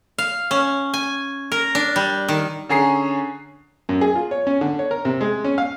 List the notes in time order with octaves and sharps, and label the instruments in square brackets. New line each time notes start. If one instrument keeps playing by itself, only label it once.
[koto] F5
C#4
G#5
A#4
D4
G3
D#3
[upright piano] D3 C#4 G#4 A#5 C7
[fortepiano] F#2
G#4
F4
C#5
C#4
D3
C#5
A#4
C3
G#3
C#4
F5